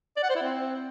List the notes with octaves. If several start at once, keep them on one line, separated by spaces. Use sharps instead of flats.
D5
F#5
C5
E4
C4